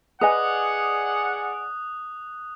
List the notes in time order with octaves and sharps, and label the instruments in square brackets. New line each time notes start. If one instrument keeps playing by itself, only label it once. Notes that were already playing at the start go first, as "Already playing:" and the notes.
[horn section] G#4 D5 F#5 [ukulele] B4 D#5 G#5 [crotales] D#6 F#6